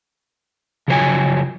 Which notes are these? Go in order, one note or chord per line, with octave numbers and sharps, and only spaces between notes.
C#3 F3 F#3 C5 C#5 G#5